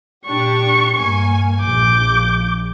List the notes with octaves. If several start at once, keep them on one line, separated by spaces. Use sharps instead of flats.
A#2 D4 G4 C#6
G2 A#3 G#5
A#1 D6 G6